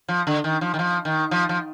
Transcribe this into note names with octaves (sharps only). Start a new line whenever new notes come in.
F3
D3
D#3
F3
D#3
F3
D#3
F3
F3